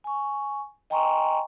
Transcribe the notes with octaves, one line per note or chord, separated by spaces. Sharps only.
G#5 C#6
D#5 G5 G#5 A#5 C6 C#6